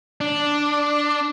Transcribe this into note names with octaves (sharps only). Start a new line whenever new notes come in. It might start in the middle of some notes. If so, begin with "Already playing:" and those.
D4